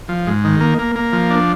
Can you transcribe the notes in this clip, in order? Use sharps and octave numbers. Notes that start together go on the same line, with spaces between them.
F3
G#2
D#3
A#3
A#3
A#3
F3
D4